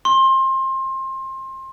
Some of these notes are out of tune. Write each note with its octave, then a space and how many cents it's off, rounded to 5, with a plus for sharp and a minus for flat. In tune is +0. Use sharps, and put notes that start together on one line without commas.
C6 +25